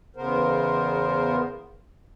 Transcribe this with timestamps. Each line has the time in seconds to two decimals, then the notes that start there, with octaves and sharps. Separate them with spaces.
0.16 E2 C#3 B3 A#4 C5